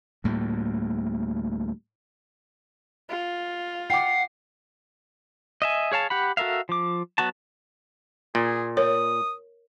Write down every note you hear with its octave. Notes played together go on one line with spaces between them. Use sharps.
D2 A2 G3 A#3
F4
F#5 G5 D6 C7
D#5 E5 G#5
G#4 C#5 F5 A5
G4 F#5 B5
F#4 A4 A#4 E5 F5
F3 D6
F#3 B3 F#4 A5
A#2 G#4
A#4 C#5 D#6